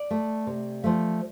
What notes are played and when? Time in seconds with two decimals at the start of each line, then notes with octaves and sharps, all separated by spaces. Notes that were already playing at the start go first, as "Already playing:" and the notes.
Already playing: D5
0.11 A3
0.47 C3
0.84 F3 A3